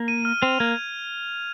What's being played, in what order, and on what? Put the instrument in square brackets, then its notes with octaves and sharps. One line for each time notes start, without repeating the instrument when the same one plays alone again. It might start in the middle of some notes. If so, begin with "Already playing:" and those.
Already playing: [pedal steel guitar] A#3
[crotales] D#7
F6
[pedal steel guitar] C4 [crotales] F7
[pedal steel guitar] A#3 [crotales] G#6